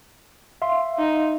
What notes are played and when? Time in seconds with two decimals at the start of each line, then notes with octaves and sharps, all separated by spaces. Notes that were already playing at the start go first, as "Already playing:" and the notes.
0.62 E5 F5 C6
0.98 D#4